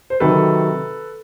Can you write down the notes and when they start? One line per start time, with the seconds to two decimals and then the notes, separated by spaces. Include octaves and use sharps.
0.10 C5
0.20 C3 D#3 F#3 A4 B4